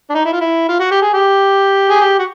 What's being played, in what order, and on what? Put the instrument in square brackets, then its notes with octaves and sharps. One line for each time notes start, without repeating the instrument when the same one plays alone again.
[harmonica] D4
D#4
E4
F4
E4
F4
F#4
G4
G#4
G4
G#4
G4
F#4